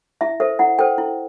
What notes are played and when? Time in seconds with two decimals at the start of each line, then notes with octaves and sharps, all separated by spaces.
0.21 E4 E5
0.40 A4 C5 E5
0.59 E4 F#5
0.79 A4 C5 G5
0.98 E4